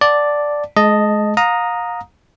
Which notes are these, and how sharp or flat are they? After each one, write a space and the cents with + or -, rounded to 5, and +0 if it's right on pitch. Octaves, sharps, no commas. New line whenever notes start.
D5 +0 F#5 +0 A5 +0
G#3 +30 D#5 +0 A5 +0
F5 +35 A#5 +0 D#6 +0